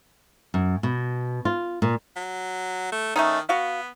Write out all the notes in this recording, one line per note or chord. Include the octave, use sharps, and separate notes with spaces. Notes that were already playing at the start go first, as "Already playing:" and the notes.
F#2
B2
F4
A#2
F#3
A3
D#3 A3 C#4 D#4
B3 F#4 F5